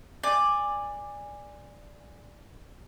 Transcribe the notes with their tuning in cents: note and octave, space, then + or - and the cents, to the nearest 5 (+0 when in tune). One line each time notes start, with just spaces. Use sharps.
D5 +5 G#5 -15